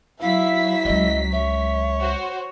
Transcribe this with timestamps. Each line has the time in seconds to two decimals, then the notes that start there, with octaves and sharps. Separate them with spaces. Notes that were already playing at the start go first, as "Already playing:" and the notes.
0.21 F#3 E4 E5 F5 B6
0.85 C#2 G#3 D#5
1.33 C#5 E5
2.01 F#4 C5